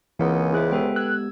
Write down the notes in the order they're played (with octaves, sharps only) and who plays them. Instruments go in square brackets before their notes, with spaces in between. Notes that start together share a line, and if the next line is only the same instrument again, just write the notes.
[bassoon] C#2 [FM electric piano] E3 [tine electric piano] A#3 C4 A#4 [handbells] G#4 F#5 G#5
[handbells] B3 C5 E5 [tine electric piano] E4 G#4 F#6
[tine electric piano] G#3 B3 G4 [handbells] A4 B4 G5
[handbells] E6 G#6 [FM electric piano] F#6